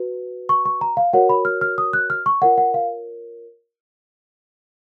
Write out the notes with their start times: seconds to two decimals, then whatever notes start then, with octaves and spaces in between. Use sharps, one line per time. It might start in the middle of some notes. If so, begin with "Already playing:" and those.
Already playing: F#4 B4
0.49 C#6
0.65 C#6
0.81 A#5
0.97 F5
1.13 F#4 A#4 C#5 F#5
1.29 B5
1.45 F6
1.61 F6
1.78 D#6
1.93 F#6
2.10 F6
2.26 C#6
2.42 F4 A#4 C#5 F#5
2.58 F#5
2.74 F5